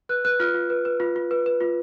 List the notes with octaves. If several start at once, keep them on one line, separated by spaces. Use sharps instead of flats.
B4 F#6
B4 F#6
F4 F6
F4
B4
B4
F4
F4
B4
B4
F4